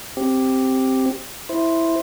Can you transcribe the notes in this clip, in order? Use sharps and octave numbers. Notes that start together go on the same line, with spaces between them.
C4 G4
E4 C5